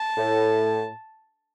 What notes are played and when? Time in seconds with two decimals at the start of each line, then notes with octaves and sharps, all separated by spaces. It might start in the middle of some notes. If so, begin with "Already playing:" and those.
Already playing: A5
0.17 A2